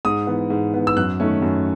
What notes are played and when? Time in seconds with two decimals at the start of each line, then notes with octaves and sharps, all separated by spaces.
0.05 G#2 D#6
0.27 E3 B3
0.50 G#2
0.74 E3 B3
0.87 E6
0.97 F#2 F#6
1.20 D#3 A3 C#4
1.42 F#2